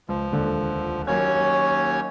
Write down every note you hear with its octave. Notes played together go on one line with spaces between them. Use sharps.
C#2 F3
D#1 C#2 D3
D#2 F#3 A#3 C#4 C#5 G#6